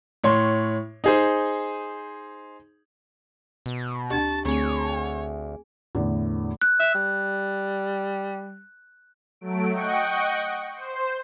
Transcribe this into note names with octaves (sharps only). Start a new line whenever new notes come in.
A2 C#5 C6
D#4 G#4 C5
B2
D2 D4 G4 A5 C#6 G#6
D2 A3 C4 G#4 C#5 G#5
E2 A2 D3 E3
F#6
E5
G3
F#3 A3 D7
D#5 F#5 G5 C#6
C5